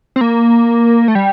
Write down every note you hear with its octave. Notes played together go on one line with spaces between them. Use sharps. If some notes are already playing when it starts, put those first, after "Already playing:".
C4
A#3
A3
G3